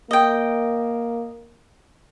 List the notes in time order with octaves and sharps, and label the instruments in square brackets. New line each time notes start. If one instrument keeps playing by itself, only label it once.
[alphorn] A#3 [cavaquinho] D#5 G5